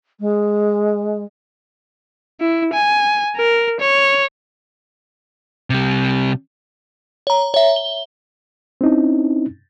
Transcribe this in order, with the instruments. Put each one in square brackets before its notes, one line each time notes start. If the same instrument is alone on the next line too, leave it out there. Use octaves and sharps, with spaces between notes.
[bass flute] G#3
[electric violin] E4
G#5
A#4
C#5
[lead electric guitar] C3 G3
[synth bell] C#5 A#5
C#5 E5
G7
[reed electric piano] C4 C#4 D#4 E4